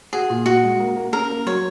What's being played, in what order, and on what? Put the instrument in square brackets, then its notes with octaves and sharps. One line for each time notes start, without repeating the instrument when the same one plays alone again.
[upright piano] F#4 [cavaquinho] G#4
[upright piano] A#2
[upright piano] A#2 [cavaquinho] F#4
[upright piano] G#3
A#3
A#3
[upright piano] C#4 [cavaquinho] A#4
[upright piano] A#3
[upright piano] F#3 [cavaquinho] C#5